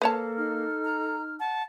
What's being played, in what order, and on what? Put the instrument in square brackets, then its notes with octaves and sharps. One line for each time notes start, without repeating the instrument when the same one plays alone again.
[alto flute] A#3 [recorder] A4 [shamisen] B4 C#5 A5
[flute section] D#4 F6
[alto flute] A#5
[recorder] F#5 [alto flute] A5